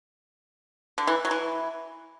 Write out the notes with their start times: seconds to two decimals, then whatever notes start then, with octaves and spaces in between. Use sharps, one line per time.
0.98 D3
1.07 E3
1.25 F#3
1.31 E3